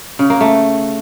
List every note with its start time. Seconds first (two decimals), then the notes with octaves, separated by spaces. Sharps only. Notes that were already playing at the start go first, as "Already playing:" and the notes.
0.19 C#3
0.30 A#3
0.41 A3